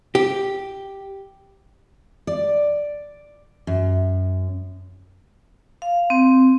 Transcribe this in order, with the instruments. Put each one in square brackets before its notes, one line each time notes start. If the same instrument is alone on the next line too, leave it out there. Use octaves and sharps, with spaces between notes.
[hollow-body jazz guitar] G4
[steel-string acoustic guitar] D5
F#2
[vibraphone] F5
C4